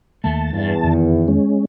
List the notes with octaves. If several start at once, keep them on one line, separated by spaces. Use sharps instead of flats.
D#2 D#3 A3 A5
E2 G2
F2 D#3
G#3 C#4